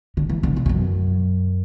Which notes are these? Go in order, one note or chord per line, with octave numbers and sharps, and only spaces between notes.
D3
E3
D3
B2
G#2
F#2